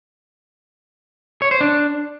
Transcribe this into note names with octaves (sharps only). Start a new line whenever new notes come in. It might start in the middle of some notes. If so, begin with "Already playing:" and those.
C#5
C5
D4